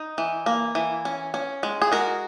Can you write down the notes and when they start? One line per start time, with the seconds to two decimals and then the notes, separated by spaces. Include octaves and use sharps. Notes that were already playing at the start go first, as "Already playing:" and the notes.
Already playing: D#4
0.18 E3
0.46 A#3
0.75 E3
1.05 C#4
1.34 C#4
1.63 G#3
1.82 G#4
1.92 G#3 F#4 A#4